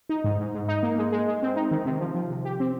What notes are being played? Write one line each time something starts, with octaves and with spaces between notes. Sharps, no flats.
D#4
G#2
G#2
G#2
D#4
A#3
G#3
G#3
G#3
C4
D#4
D#3
C3
F3
F3
C3
G4
C4